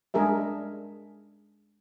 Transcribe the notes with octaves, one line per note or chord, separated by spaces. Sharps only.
G#3 D4 G#4 A#4 E5